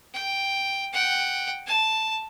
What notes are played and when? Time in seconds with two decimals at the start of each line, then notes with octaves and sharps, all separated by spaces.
0.14 G5
0.93 F#5 G5
1.66 A5